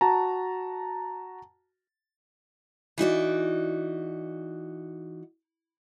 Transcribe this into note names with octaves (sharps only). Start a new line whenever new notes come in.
F#4 A5 A#5
E3 D#4 F#4 D5